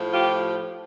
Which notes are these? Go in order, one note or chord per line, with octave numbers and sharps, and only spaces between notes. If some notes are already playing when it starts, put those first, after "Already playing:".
Already playing: A2 F3
F4 G4